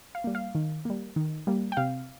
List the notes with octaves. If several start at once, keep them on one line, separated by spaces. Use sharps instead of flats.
F5
G3 A#3
F5
D#3
G3 A#3
D#3
G3 A#3
G5
C3 F5